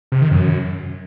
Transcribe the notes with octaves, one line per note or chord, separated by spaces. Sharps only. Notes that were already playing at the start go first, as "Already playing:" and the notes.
C3
D#3
F#2